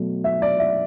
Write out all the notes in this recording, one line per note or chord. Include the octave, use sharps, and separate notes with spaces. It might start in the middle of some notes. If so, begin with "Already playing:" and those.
Already playing: B2 F#3 A3
E5
D5
E5